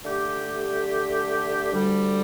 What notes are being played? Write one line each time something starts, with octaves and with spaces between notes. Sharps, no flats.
D3 A3 G4
D2 D3 G3